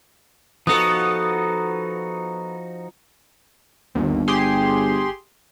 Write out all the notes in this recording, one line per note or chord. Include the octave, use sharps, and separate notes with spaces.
F3 B3 D#4 F#4 A4 D#6
G1 D#2
G4 G#4 C6